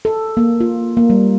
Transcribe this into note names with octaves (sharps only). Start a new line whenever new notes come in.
A4
A#3
F4
A#3
G3